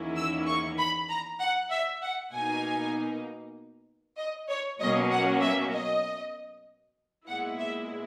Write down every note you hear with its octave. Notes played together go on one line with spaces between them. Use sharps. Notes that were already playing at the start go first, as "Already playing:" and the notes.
Already playing: E2 D#3 A#3 C#4 E4
E6
C#6
B5
A#5
F#5
E5
F#5
B2 A#3 D#4 G#5
D#5
C#5
B2 F#3 A#3 C#4 D#5
F#5
E5
D#5
A#2 G#3 B3 E4 F#5
E5